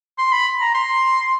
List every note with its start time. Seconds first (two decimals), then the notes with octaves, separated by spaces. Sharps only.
0.18 C6
0.33 B5
0.61 A#5
0.74 C6